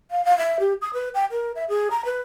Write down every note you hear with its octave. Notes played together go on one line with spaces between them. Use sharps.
F5
F5
E5
G4
D#6
B4
G5
A#4
E5
G#4
A#5
B4